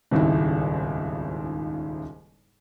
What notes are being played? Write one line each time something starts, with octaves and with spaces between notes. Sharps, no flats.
D#1 G#1 C#2 G#2 E4